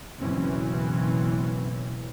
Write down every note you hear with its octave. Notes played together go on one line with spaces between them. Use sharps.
F#1 B2 E3 C4 C#4